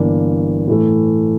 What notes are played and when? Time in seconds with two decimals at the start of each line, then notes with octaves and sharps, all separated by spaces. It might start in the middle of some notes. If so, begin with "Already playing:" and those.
Already playing: G1 G2 E3 A#3 D4
0.68 A2 E3 A3